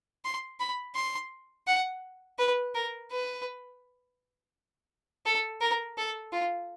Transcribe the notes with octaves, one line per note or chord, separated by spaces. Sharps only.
C6
B5
C6
F#5
B4
A#4
B4
A4
A#4
A4
F4